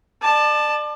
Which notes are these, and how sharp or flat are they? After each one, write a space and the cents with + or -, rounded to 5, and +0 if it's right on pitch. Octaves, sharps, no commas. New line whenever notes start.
D5 +35 A5 +0